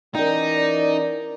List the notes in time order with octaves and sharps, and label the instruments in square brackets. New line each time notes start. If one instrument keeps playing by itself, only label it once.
[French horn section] E3 C#4 D5 [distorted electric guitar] D#4 [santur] A#4 G5